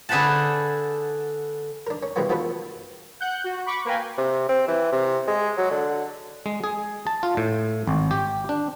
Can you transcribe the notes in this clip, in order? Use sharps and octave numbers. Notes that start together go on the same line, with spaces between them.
D3 G#4 B4 C5 F#5 A5
D4 A#4
C#4
B2 E3 G3 G#3 A#3 B3
D#3 F3 B3 F#4 A4 B4
F#5 F#6 G6
F#4
B5 C#6 D6
A#3 A#4 B4 F5 G5 G#5
C3
C4
E3
C3
G#3
F#3
D3
G#3
G#4
A5
F4
A2
G#1
G4
D4